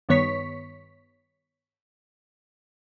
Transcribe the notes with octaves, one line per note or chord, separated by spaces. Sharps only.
G2 D#3 B3 C#5 C#6 B6